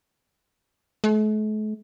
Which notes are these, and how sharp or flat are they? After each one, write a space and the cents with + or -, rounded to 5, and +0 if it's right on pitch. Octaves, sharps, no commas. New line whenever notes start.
A3 -45